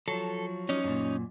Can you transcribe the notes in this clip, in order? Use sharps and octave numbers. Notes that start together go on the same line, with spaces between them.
F3 F#3 A4
C#4 D#4
F#2 A#2